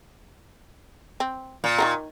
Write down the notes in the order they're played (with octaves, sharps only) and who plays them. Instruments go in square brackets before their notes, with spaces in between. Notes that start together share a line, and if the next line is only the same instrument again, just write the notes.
[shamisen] C4
[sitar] A#2
[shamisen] D#3 F#3 A#4